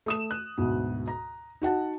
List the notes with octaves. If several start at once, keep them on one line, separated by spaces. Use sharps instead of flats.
A3 D#6 E7
F#6
D2 G#2 B2
A#5
D#4 F#4 F#5 A5